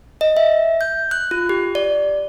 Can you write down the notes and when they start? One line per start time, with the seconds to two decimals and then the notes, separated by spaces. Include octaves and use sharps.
0.21 D#5
0.37 E5
0.81 G6
1.11 F#6
1.31 F4
1.49 G4
1.75 D5